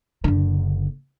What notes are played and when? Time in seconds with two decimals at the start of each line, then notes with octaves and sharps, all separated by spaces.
0.24 F#1 D3